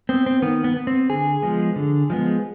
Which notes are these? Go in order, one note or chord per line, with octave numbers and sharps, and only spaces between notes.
B3 C4
C4
D#3 B3
B3
B3
C4
D3 G#4
F3 G#3 B3
D3
F3 G#3 B3